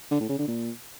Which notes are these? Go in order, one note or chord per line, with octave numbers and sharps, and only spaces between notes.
D3
A2
C#3
D3
A#2